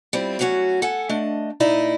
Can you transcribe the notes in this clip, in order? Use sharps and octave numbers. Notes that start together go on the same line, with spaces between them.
G3 C4 E4 F4
F#3 A3 C#4 F4 F#4
A4 F#5 G#5
A3 D4 D#5
A#2 A#3 D#4 E4 D5 D#5